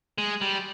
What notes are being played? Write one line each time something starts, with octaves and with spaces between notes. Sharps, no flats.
G#3
G3